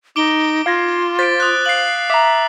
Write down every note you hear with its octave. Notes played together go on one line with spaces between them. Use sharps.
D#4 D6 D7 G7
F4 F5 G#6 A#6
C5 A6 B6 D7
D#6 F#6
F5 C7 F#7
E5 A#5 D6